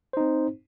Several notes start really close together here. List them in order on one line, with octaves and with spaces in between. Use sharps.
C5 D#4 C4